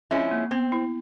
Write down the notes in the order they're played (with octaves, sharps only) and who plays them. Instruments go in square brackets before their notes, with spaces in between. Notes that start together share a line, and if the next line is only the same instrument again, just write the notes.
[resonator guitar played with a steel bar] F3 G#3 C#4 E4 [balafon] C4
[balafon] A#3
[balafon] B3 [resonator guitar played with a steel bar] C4
[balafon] E4